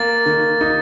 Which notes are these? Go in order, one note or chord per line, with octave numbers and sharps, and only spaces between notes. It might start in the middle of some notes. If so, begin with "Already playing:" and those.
Already playing: A#3 A6
D#3
D#4